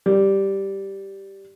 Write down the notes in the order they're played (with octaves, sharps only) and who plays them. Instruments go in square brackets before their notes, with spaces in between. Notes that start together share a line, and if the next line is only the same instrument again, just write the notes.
[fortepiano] G3